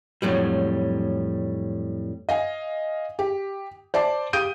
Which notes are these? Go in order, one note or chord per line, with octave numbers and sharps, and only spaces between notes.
F2 A2 F#3 G3
D#5 F5 G#5
G4
C5 D5 A5 D6
G4 F5 D#6 G6 D7 D#7